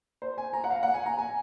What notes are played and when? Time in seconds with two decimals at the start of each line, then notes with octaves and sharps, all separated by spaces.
0.22 C5
0.38 G#5
0.53 A#5
0.64 F#5
0.70 F5
0.83 F#5
0.94 G#5
1.06 A#5
1.19 G#5